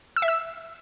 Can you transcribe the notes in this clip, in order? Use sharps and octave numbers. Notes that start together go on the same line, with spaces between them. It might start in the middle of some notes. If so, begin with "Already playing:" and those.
E6
E5
E6